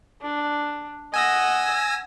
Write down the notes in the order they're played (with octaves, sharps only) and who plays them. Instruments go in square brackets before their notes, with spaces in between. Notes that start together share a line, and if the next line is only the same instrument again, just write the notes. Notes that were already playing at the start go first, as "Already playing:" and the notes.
[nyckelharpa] D4
[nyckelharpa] D#5 F#5 [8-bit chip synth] G#5 E6 A#6